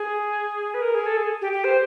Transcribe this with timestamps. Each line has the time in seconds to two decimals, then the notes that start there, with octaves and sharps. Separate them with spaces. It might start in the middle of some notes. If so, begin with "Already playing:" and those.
Already playing: G#4
0.74 B4
0.82 A#4
0.95 G#4
1.06 A4
1.17 G#4
1.41 G4
1.52 G4
1.64 C5